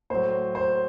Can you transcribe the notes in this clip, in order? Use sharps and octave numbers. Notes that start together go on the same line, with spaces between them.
A2 F#3 C5
C5